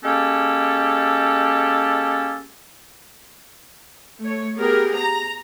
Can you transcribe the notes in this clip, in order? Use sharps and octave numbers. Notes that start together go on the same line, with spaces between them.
G#3 A#3 C#4 G4 A4
A3 C#5
B3 G4 G#4 A#4
A#5